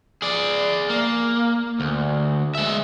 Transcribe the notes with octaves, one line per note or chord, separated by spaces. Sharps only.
G#4 D5
A#3
D2
G#3 E5